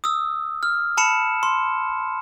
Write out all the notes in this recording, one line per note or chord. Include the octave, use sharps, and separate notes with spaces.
D#6 E6
F6
A5 B5 C#7 E7
C6